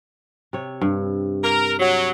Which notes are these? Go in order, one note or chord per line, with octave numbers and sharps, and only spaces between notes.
C3 C#5
G2
A#4
F#3